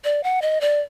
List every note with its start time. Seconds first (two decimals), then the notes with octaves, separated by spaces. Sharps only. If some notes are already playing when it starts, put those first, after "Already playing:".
0.04 D5
0.24 F#5
0.42 D#5
0.61 D5